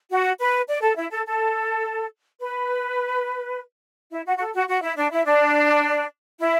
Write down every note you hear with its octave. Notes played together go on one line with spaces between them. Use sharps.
F#4
B4
D5
A4
E4
A4
A4
B4
E4
F#4
F#4
A4
F#4
F#4
E4
D4
E4
D4
E4